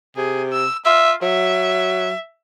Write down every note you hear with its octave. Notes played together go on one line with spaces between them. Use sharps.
C3 G#4
E6
F4 E5
F#3 E5